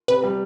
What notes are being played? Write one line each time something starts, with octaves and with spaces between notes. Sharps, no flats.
C3 B4
G3